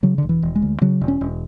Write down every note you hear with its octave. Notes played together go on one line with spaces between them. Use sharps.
C#3 F#3
E1 D3
E3
E1
G#3
D2
C#3 F#3
E1
C#4
E1